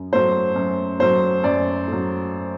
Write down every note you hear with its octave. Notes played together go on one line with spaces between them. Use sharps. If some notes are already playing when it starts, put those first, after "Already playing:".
Already playing: F#2
F#3 A3 C5
F#2
F#3 A3 C5
F#2 D5
F#3 A3